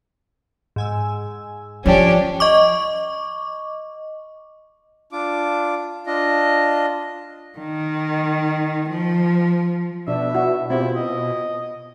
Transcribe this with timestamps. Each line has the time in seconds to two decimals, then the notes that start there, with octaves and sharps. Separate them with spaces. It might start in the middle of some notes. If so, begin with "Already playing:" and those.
0.76 G#2 G#5 E6
1.86 F3 C#4 D4 G4
2.40 D#5 C#6 D6
5.12 D4 F4 D6
6.06 D4 F4 D#5
7.58 D#3
8.89 F3
10.08 B2 D4 E5
10.34 E4 F#4
10.70 C4 E4 F4 G4
10.96 D#5